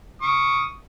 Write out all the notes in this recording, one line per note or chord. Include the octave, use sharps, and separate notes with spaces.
C#6 D#6